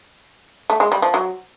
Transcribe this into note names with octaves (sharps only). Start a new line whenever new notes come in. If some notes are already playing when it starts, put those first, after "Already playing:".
A3
G#3
G3
F3
F#3